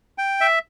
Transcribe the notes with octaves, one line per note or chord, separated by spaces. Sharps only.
G5
E5